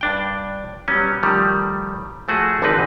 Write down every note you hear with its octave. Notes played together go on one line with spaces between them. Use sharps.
G2 D4 G5
F#3 G3 B3 C#4
D#3 F3 G3 A3
F3 A3 F#4 G#4
G#1 D3 E3 C4 D#4 B4